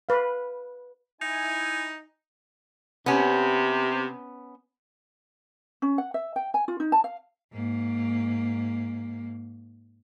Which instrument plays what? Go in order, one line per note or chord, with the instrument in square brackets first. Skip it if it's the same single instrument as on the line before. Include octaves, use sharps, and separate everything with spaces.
[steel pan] B4 F5
[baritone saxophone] D#4 [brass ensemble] E4 G#5
[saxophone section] C3 [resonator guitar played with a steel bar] B3 C#4
[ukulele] C#4
F#5
E5
G5
G#5
F4
D#4
A5
F5
[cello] G#2 A#3